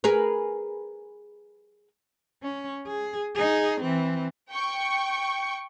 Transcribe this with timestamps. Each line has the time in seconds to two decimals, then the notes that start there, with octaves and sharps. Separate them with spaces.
0.04 G#4 A#4 B4
2.42 C#4
2.87 G#4
3.35 D#4 G#4
3.80 E3 C4
4.51 G5 C#6